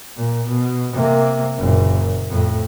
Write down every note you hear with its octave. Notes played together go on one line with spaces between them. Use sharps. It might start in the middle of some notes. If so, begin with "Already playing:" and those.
A#2
B2
C3 A#3
F#1 A#2
F2 A2